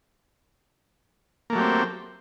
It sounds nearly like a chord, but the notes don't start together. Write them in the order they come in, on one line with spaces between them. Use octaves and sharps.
A#3 A3 F#3 G4 C4